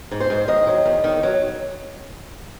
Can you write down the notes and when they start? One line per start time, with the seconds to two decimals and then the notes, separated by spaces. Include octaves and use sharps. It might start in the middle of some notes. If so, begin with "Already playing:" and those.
0.11 G#2
0.20 C5
0.30 G#2
0.48 D#3 D#5
0.67 F#3
0.86 E2
1.04 D#3
1.23 F#3